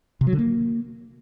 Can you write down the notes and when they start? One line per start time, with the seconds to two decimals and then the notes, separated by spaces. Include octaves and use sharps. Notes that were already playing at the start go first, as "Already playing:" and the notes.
0.21 C3
0.27 F#3
0.33 D3
0.39 A#3